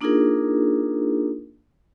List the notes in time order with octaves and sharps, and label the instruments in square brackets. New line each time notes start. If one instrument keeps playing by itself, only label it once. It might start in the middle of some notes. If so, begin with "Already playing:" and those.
[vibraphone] A#3 D4 D#4 F4 G#4 A#4